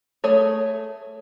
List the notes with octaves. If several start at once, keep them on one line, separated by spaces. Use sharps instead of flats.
A3 G#4 C#5